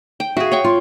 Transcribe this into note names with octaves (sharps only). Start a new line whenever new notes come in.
G5
F#4 G#4 E5 F5
C#5 G5 C#6
F4